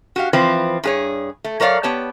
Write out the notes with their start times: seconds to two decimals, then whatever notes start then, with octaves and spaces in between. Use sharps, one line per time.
0.16 F#4 G4 F5
0.33 E3 F3 C4 B4
0.83 G2 G#4 C#5
1.44 A3
1.60 F#3 A#4 C#5 D5 F5
1.83 B3 G4 C#5 A5